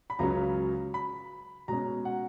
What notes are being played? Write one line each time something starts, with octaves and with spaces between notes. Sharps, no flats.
B5
C#2 C#3 F#3 C#4 A#5
B5
B2 G#3 C#4 A#5
F#5